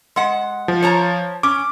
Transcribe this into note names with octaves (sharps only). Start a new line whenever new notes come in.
G#3 F#5
F3
C#5 A5 A#5
C#4 D6